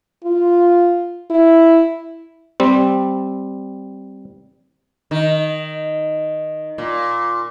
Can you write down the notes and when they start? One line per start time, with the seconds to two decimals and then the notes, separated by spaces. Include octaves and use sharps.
0.25 F4
1.30 E4
2.60 G3 C4
5.11 D#3
6.78 A#2